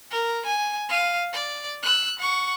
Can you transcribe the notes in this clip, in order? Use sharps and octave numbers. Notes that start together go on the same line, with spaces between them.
A#4
G#5
F5 D#7
D5
E6 F#6
F#5 C#6